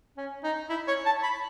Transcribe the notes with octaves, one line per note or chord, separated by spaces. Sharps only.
C#4
D#4
E4
C#5
A5
B5